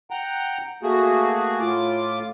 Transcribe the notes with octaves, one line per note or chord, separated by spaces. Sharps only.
F#5 G5 A#5
A3 A#3 F#4 G#4
A2 F4 D6